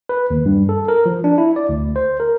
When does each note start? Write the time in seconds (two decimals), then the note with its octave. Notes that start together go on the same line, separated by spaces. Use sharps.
0.09 B4
0.30 D#2
0.46 G2
0.69 A4
0.88 A#4
1.06 F3
1.24 D4
1.38 E4
1.56 D5
1.69 D2
1.96 C5
2.20 A#4